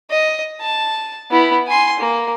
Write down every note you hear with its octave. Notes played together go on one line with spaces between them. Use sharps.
D#5
A5
B3 E4
G#5 C6
A#3